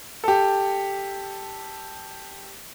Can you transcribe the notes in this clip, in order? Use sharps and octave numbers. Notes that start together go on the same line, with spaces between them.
G4 A4